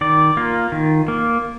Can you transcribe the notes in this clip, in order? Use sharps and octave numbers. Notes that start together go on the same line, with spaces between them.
D#3 D5
A#3 F4
D#3
A#3